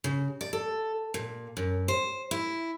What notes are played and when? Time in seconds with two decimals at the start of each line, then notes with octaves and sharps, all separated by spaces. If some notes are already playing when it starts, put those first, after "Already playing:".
0.04 C#3
0.41 D5
0.53 A4
1.14 A#2
1.57 F#2
1.88 C5
2.31 E4